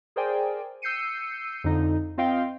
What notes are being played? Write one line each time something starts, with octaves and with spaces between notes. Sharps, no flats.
G#4 A#4 C5 D5 G5 G#5
E6 G6 C7 C#7 D#7
F2 D3 D#4
C4 F4 D#5 F5 G5 C6